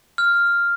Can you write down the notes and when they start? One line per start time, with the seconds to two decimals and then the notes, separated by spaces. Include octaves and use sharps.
0.18 F6